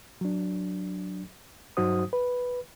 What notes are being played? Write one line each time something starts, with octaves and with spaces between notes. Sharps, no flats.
F#3 D4
G2 F#3 D#4 F#4 C5 D#6
B4